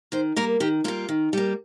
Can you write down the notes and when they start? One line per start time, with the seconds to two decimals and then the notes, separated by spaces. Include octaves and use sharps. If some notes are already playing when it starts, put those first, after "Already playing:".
0.12 D#3 C5
0.36 G3 A#3 A#4
0.60 D#3 G4
0.84 G3 A#3 F4
1.09 D#3
1.33 G3 A#3